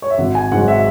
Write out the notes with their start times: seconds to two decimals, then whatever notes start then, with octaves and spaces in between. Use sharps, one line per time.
0.02 C#5
0.10 E5
0.18 G#1 F#5
0.35 G#5
0.52 G#2 F#3 F#5
0.68 E5